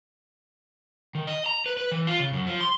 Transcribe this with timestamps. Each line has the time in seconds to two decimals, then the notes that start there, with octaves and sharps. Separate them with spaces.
1.15 D#3
1.27 D#5
1.46 A#5
1.66 B4
1.77 B4
1.92 E3
2.07 F4
2.19 C#3
2.33 F#2
2.47 F3
2.61 C6